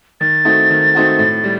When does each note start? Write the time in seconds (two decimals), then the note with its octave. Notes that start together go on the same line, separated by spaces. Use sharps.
0.21 D#3 A6
0.45 A3 C4 D#4 F#4
0.70 D#3
0.95 A3 C4 D#4 F#4
1.19 A2
1.44 G3